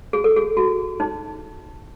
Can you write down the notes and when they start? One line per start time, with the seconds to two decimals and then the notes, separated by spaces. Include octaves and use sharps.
0.13 G#4
0.24 A4
0.36 G#4
0.57 F#4
1.00 D#4